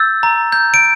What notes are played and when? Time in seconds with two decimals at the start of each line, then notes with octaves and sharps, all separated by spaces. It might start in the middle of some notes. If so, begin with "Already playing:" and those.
Already playing: E6 G6 A6
0.23 A#5
0.52 G6
0.74 D7